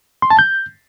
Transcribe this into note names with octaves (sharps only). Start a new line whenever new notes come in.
C6
A5
G6